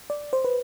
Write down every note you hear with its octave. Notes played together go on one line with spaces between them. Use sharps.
D5
C5
B4